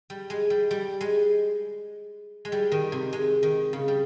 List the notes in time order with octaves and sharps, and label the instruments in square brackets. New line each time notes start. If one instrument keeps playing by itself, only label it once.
[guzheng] G3
G#3
G3
G3
G#3
G#3
G3
D#3
C3
G#3
D#3
C#3
G3